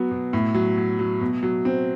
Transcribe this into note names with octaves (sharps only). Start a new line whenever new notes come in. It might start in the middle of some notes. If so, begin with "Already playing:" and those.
Already playing: F#3 B3 F#4
B2
A2
F#3
F#3
F#3
B2
F#3
C4